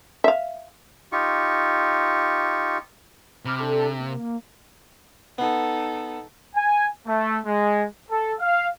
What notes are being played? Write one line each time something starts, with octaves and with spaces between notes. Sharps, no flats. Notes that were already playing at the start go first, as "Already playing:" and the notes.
E5 F5
D#4 F4 G4 C#6
C3 B5 D6 F6
D4 A4
A#3
B3 D#4 A4
G#5
A3
G#3
A4
F5